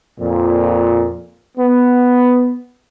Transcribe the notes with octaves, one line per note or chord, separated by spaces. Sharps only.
F2 A#2
B3